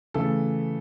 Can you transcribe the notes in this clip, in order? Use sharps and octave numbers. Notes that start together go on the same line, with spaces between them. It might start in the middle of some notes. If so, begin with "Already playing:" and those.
C#3 E3 A3 A4